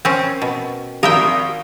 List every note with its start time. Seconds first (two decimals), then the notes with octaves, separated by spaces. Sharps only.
0.05 C4 C#4 A#4 G5
0.42 B2
1.03 G#1 A#4 E5 F5 G5 D#6